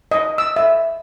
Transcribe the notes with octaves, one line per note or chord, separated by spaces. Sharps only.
D#5
E6
E5